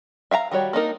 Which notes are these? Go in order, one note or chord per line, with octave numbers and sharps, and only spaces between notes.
E5 F5 G5 A#5
D#3 G3 F#4 C#5
A#3 D4 D#4 A#4